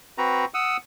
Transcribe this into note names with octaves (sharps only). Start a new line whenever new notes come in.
C4 F#4 B4 A#5
F#5 D#6 E6